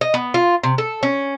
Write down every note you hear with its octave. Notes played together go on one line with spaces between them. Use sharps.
D#5
B3
F4
C3
A4
C#4